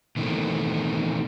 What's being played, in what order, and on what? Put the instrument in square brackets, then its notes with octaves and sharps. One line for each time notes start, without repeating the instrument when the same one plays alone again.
[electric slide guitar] B2 D#3 E3 A3 A#3 C4